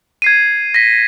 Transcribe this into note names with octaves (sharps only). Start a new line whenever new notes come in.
G#6 C7 D#7
A#6 B6